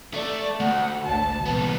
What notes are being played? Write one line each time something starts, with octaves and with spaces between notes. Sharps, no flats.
A3 D5
D2 A3 F#5
G#1 C#2 C#5 A5
C2 A#2 E3 B3